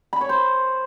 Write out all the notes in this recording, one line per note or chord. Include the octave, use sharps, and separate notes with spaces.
B5
C#5
C5